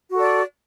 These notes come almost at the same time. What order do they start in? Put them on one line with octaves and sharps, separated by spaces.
F#4 A4 D5